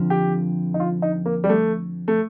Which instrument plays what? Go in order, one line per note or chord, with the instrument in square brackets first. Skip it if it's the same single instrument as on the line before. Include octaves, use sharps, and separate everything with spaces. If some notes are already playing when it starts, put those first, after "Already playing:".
Already playing: [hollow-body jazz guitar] F2 D3 F3
[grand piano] G4
D#4
F4
D#4
A#3
G3
A3
A3